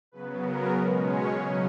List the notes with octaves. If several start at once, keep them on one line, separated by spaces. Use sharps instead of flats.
C#3 F#3 B3 B4
A#4
B2 G#3 C#4 B4
C#5
C#3 F#3 C#4